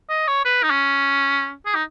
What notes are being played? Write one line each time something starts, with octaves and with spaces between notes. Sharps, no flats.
D#5
C#5
B4
D#4
C#4
G#4
D#4